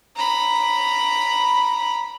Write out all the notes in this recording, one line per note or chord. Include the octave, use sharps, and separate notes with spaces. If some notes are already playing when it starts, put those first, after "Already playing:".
A#5 B5